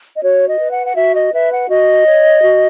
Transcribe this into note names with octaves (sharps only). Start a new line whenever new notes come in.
D#5
F#4 C#5
D#5
B4
F#5
F#5
F#4 E5
D#5
B4 E5
F#5
F#4 D#5
C#5
F#4